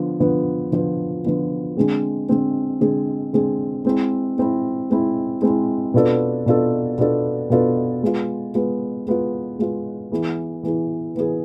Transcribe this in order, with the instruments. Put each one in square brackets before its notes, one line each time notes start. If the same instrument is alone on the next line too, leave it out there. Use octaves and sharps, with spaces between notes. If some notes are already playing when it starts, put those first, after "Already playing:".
Already playing: [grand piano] D3 F3 B3
D3 F3 B3
D3 F3 B3
D3 F3 B3
D3 G#3 C4 G#4
D3 G#3 C4 G#4
D3 G#3 C4 G#4
D3 G#3 C4 G#4
G#3 C4 E4
G#3 C4 E4
G#3 C4 E4
G#3 C4 E4
B2 B3 D4 F4 A4
B2 B3 D4 F4 A4
B2 B3 D4 F4 A4
B2 B3 D4 F4 A4
G#3 B3 F4
G#3 B3 F4
G#3 B3 F4
G#3 B3 F4
E3 B3 E4 G#4
E3 B3 E4 G#4
E3 B3 E4 G#4